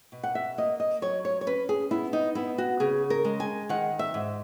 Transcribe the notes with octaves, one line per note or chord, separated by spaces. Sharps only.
B2
F#5
E5
A#3 D#5
D#5
F#3 C#5
C#5
C#5
C#4 B4
G#4
B3 E4
D#4
B3 E4
F#4
C#3 G#4
A#4
G#3
G#5
D#3 F#5
E5
G#2